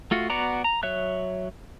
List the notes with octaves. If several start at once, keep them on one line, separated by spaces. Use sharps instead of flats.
A3 F4 F#4
B3 F#4 D5 F#5 A#5
A#5
F#3 C#5 E5 F#6